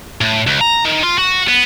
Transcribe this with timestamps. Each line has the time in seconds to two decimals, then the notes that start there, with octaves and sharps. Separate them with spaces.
0.21 A2
0.47 C#2
0.61 A#5
0.85 D#3
1.03 F4
1.18 F#4
1.48 B3